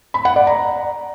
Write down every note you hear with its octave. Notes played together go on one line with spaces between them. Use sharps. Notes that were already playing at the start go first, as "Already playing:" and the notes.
B5
F#5
D5
A#5